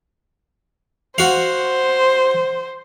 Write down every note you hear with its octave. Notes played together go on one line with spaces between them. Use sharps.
F#4 C5 F5